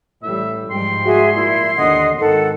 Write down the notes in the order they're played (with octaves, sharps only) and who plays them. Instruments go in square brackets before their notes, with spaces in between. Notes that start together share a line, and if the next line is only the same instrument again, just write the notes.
[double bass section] A1 G3 [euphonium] A2 [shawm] E5
[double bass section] G#2 F3 G3 [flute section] G5 [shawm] C6
[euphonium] F#4 [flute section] G#4 E5
[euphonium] A#2 [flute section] E4
[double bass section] D#2 [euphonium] D3 [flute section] D#5 F#5 D#6
[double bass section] G#1 [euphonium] D#3 [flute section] A4 F#5